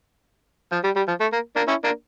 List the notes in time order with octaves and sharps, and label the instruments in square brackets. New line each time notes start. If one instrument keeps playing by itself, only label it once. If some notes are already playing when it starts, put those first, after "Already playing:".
[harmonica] F3
G3
G3
F3
A3
A#3
A#3 D4
C#4 E4
A#3 D4